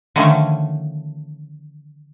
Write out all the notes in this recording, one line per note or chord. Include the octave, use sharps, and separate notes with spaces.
D3 D#3 F3 A3 C#4